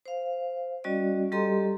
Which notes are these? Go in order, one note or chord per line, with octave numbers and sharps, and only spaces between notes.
C5 F5
G3 C#4 F#4 D5 D#5
G3 G4 A4 D#5 A#5 C6